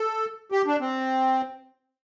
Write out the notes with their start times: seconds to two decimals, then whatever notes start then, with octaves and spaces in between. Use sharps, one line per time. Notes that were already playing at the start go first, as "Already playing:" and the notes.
Already playing: A4
0.52 G4
0.66 D4
0.80 C4